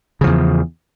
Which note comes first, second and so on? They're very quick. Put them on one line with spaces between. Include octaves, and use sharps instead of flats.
C#3 F3 E2